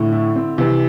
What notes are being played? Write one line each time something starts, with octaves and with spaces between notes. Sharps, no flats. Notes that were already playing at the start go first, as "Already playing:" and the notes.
Already playing: A2 D3
E4
C4
C3 E3